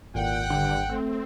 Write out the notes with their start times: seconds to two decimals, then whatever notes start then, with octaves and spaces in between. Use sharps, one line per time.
0.15 G#1 A#2 F#5 G5
0.50 G2 D3
0.90 A3 C4